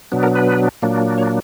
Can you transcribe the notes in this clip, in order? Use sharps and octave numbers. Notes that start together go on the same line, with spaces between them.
B2 F#3 B3 D4
A#4
B4
A#2 F#3 A#3 D4
C#5